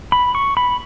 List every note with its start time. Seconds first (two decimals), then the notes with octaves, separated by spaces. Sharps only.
0.12 B5
0.35 C#6
0.57 B5